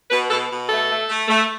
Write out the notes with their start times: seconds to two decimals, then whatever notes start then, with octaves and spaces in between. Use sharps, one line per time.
0.11 B2 B4
0.30 B2 A4
0.51 B2
0.69 A3 A4
0.89 A3
1.09 A3
1.28 A3